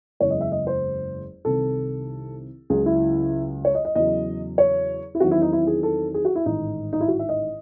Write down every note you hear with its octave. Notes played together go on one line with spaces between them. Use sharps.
F#1 E2 C#3 G#3 C#5
D#5
E5
D#5
C5
C2 C3 D#3 A4
C#2 C#3 F#3 C#4 G#4
E4
C#5
D#5
D#5
E2 C#3 F#3 D#5
C#5
E4
E2 D#3 F#3 C4 F#4
E4
D#4
E4
G#4
A4
G#4
F#4
E4
A1 G#2 D#3 D#4
D#4
E4
F#4
E5
D#5